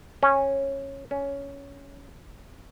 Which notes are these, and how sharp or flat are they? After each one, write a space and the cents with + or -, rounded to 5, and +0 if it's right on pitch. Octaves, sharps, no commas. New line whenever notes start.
C#4 -15
C#4 +10